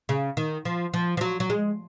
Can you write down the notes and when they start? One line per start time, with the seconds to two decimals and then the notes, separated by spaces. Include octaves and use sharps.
0.09 C#3
0.37 D#3
0.65 F3
0.94 F3
1.17 F3
1.21 F#3
1.40 F#3
1.50 G#3